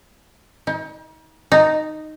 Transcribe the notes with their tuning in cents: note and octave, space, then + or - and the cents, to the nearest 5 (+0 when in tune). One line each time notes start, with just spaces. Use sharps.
D#4 +40
D#4 -5